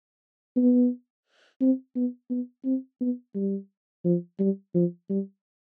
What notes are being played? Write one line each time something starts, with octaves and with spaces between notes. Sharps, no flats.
B3
C4
B3
B3
C4
B3
G3
F3
G3
F3
G3